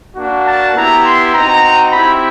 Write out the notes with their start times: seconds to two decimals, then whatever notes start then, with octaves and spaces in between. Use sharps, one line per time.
0.16 A#3 D4 F#4
0.45 A5
0.75 B3 E4 G4 A#5
1.04 C6
1.34 C4 D#4 F#4 A#5
1.93 C4 E4 G4 B5